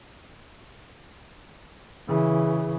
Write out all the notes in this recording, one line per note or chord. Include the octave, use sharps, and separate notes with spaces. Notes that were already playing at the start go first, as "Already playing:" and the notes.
C#3 E3